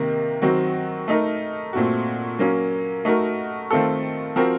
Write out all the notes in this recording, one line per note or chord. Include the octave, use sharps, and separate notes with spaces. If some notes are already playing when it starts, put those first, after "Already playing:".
Already playing: C3 D#3 A#3
D#3 F#3 C4 F#4
A3 D#4 A#4
A#2 A3 C4 F#4
F#3 A#3 C#4
A3 D#4 F#4 A#4
D#3 A3 C4 F4 A4
F3 C4 F#4 A#4